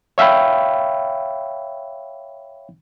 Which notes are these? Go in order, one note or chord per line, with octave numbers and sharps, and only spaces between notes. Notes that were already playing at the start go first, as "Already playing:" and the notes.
C#5 E5 F5 G5 B5